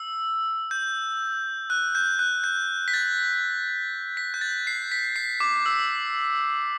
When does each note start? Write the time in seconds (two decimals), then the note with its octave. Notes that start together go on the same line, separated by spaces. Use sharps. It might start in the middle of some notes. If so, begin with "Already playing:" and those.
Already playing: E6
0.71 G6
1.70 F#6
1.95 G6
2.19 F#6
2.44 G6
2.88 B6
2.94 A6
4.17 B6
4.34 G6
4.41 A6
4.67 C7
4.92 B6
5.16 C7
5.40 D6
5.66 E6